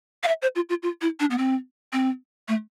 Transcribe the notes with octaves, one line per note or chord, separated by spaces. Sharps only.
F5
E5
C5
F4
F4
F4
E4
D4
B3
C4
C4
A3